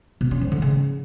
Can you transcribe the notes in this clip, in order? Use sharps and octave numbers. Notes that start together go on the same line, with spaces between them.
B2
C#4
F3
D3
C#3